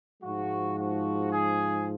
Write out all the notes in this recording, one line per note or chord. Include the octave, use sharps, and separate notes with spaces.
G#2 F3 G#3 F#4
F#4
G#4